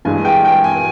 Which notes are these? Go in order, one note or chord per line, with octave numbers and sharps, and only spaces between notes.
G2 E3 G#3 G#5
G5
G5
G#5